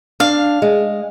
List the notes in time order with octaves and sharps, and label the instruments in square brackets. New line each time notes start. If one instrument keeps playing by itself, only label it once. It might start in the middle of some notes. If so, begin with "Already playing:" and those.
[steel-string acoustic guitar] D4 [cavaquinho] F5
[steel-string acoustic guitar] G#3